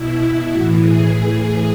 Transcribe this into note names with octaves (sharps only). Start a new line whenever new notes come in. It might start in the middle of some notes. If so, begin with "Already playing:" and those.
Already playing: B2 E4
A2 E3 F#4
G#4
A2 E3 G#4